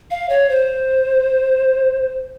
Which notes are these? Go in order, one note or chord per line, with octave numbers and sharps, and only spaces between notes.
F5
C#5
C5